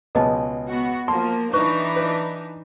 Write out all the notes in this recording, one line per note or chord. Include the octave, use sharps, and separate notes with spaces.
C#2 B2 G#3 B4 D#5 A5
B3 F#4
F3 A#3 A5 C6
E3 D4 D#4 B4 C#6
B4